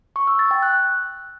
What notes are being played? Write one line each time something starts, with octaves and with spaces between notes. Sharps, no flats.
C#6
E6
A6
G5
F#6